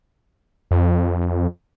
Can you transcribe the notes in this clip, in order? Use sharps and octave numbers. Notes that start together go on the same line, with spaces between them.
F2